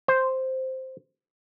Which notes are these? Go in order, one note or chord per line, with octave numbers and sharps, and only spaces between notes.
C5